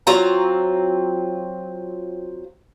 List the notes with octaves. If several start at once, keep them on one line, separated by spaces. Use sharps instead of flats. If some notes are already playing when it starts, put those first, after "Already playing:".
F#3 C4 F4 A#5